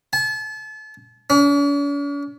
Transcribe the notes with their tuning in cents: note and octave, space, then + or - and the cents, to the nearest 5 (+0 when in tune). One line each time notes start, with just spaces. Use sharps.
A5 -35
C#4 +45